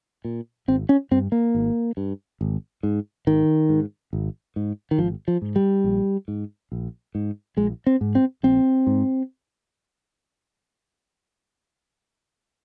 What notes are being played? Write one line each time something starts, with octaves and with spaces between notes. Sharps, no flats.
A#2
G#1 C4
C#4
G2 C4
A#3
G#1
G2
G#1
G#2
G#1 D#3
G#2
G#1
G#2
D#3
G#1 F3
F3
G#2
G3
A#1
G#2
A#1
G#2
A#1 G#3
C4
G#2
C4
A#1 C4
G#2